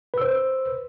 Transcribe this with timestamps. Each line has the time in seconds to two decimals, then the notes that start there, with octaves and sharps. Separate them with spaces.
0.14 B4
0.18 E6
0.22 C5